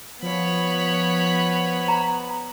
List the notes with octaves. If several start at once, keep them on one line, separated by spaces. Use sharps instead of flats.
F3 B3 C#5 B5
A#5